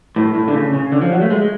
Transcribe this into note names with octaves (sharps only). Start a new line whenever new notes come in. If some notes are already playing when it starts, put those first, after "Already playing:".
A2
A2
D3
C#3
C#3
D3
F3
F#3
A3
G#3